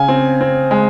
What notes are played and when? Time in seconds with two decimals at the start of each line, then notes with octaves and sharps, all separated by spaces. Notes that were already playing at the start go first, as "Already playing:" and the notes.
Already playing: C#3 G#5
0.08 C4
0.41 C4
0.71 G#3